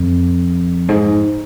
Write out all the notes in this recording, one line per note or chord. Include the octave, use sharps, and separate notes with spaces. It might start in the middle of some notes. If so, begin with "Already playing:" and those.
Already playing: F2
G#2